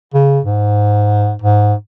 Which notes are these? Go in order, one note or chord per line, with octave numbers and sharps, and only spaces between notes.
C#3
G#2
G#2